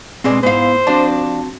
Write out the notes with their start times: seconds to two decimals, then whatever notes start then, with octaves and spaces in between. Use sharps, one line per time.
0.24 B2 G#3 C4 D4
0.43 G#2 B3 E4 C5 F5
0.87 F3 C4 D4 F#4 A5